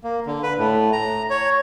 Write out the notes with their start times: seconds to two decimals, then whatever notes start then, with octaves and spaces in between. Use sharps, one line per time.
0.04 A#3
0.26 D3
0.43 B4
0.58 A2
0.93 A#5
1.30 C#5